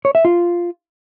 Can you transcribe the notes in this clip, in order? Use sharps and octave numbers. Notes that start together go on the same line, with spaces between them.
C#5
E5
F4